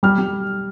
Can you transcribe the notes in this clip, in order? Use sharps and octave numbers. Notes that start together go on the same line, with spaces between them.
G3 F6
G3